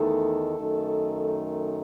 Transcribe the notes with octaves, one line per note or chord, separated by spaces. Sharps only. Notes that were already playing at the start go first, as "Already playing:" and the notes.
Already playing: E2 D#3 A3 D#4 A4
F#2 D#3 A3 D#4